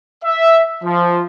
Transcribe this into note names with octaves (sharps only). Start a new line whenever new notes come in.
E5
F3